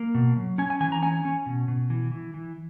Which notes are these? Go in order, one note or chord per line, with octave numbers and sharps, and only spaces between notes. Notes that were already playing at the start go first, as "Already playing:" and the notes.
Already playing: A#3
B2
F#3
C#4 G#5
G#5
E3 G#5
A#5
C#4 G#5
C#4
B2
B2
E3
E3
E3